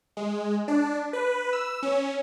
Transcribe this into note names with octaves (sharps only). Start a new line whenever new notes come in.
G#3
D4
B4
E6
C#4